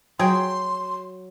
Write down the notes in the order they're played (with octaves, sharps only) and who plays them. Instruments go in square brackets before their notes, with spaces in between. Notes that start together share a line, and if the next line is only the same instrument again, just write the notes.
[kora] F#3 [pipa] G#4 G5 [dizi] C6